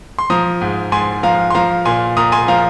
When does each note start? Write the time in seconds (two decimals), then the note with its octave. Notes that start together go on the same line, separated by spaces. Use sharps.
0.19 C6
0.30 F3 A#5 D#6
0.61 G#2
0.92 G#2 G#5 C6
1.23 F3 F5 A#5
1.51 C6
1.54 F3 F5 A#5
1.85 A#2 G#5 C6
2.17 A#2 A#5 D#6
2.32 G#5 C6
2.48 F3 F5 A#5